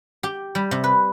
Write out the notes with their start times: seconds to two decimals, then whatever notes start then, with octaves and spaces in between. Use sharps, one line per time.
0.23 G4
0.55 G3
0.71 C3
0.84 B4